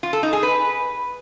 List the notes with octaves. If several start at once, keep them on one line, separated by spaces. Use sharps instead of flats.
F4
A4
D#4
G#4
B4